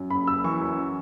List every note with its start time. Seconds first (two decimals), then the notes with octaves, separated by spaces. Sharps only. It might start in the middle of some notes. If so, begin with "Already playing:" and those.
Already playing: F#2
0.10 F#1 B5
0.27 F#1 E6
0.44 E3 C#6
0.61 F#2